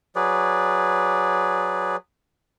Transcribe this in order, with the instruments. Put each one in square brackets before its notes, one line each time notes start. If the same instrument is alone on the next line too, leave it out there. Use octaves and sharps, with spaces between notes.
[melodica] F#3 G#4 B4 D5